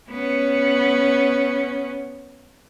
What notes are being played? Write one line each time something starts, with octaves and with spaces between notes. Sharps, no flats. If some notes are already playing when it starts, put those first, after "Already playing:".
B3 C#4